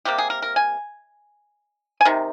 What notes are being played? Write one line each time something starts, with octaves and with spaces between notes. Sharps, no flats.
C3 G3 A#3 G4
G#4
A#4
A#4
G#5
G#5
C3 D#3